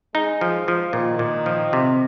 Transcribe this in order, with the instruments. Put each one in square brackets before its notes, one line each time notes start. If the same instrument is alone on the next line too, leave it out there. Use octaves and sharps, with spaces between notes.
[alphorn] G#3 [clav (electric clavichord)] D#4
[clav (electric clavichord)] F3
F3
[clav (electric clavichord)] A#2 [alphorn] D#3
[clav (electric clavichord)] A#2
F3
C3